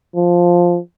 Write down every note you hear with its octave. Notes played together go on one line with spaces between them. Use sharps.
F3